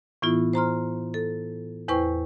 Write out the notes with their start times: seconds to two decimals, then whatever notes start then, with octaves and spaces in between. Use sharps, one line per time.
0.22 A2 E3 B3 E4 F4
0.53 C5 A#5 C6 F6
1.14 A4
1.88 E2 E4 B4 C5 G5 C#6